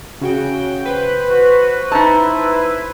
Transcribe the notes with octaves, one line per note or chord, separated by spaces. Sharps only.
C#3 F#4 G5
B4 C5
F#4
D#4 E4 A5